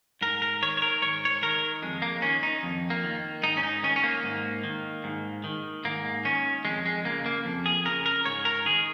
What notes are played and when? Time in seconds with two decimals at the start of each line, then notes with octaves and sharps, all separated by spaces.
0.21 G#2 A#4
0.42 A#4
0.62 D#3 C#5
0.77 C#5
0.82 A#4
1.02 G#2 C#5
1.25 C#5
1.42 D#3 A#4
1.82 F2 G#3
2.02 A#3
2.22 D#3 C#4
2.43 D#4
2.63 F2
2.90 A#3
3.04 D#3
3.43 G#2 D#4
3.57 C#4
3.63 D#4
3.83 D#3 C#4
3.96 C#4
4.03 A#3
4.24 G#2
4.64 D#3
5.04 G#2
5.44 D#3
5.85 G#2 A#3
6.25 D#3 C#4
6.65 F2 G#3
6.85 G#3
7.04 C#3 A#3
7.26 A#3
7.45 F2
7.66 G#4
7.85 C#3 A#4
8.06 A#4
8.25 G#2 C#5
8.45 A#4
8.66 D#3 G#4